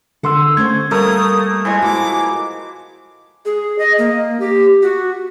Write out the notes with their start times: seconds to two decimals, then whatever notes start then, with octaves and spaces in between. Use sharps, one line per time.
0.23 D3 A4 F#5 C6 E6
0.57 A3 C#4 C5 G#6
0.91 G3 A3 A#3 A#4 D#6
1.65 E3 F3 G#3 G#5
1.82 F#4 D6
3.45 G#4
3.79 D#5
3.99 A#3
4.40 G4
4.82 F#4